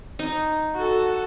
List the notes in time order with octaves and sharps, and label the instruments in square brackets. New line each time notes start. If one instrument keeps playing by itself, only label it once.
[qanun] D#4
[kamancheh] F#4 A4